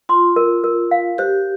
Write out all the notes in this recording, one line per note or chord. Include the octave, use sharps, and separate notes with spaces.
F4 C6
A#4
A#4
F5
G4 C5